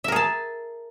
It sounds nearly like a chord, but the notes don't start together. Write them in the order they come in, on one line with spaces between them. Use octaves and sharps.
E5 A#4 G#4 A5